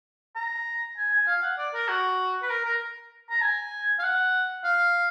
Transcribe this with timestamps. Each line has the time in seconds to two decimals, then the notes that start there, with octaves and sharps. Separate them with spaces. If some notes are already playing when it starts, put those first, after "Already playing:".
0.36 A#5
0.97 G#5
1.12 G#5
1.27 F5
1.42 F#5
1.58 D5
1.74 A#4
1.88 F#4
2.42 B4
2.50 A#4
2.65 A#4
3.30 A#5
3.41 G#5
3.99 F5
4.04 F#5
4.64 F5